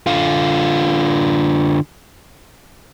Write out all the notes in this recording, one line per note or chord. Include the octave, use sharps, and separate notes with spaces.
D3 F4